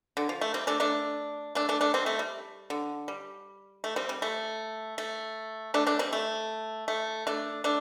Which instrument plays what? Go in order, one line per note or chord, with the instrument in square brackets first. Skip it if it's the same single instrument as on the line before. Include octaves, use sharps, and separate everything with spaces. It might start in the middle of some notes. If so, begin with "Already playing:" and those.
[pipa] D3
F3
A3
G3 C4
A3 D4
A3 D4
A3 D4
A3 D4
A3 D4
G3 C4
A3
G3
D3
G3
A3
G3 C4
G3
A3
A3
A3 D4
A3 D4
G3 C4
A3
A3
A3 D4
A3 D4